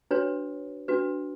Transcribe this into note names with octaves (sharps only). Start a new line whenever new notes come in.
D4 F#4 B4 C#5
D4 F#4 B4